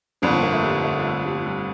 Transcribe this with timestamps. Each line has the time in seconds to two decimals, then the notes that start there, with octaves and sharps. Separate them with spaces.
0.22 G1 F2 D3 C4
0.32 C4
0.43 A#3
0.53 A3
0.64 G3
0.84 A3
1.04 A3
1.25 G3
1.36 F3
1.46 G3